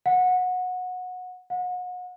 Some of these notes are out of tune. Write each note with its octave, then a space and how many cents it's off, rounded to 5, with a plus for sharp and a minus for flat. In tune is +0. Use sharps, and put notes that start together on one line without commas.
F#5 -20
F#5 -35